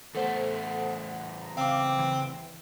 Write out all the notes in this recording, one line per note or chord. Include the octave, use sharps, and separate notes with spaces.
E2 A3 A4 C5 F#5
A#5
C#3 C4 F5 D6
E3